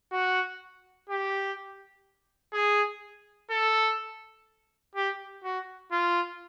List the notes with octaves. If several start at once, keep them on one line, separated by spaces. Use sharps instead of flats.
F#4
G4
G#4
A4
G4
F#4
F4